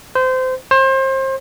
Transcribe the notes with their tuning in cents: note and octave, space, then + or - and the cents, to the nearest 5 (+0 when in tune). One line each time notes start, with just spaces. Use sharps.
C5 -25
C5 +30